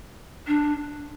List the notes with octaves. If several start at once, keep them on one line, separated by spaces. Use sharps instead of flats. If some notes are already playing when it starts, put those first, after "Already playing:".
D4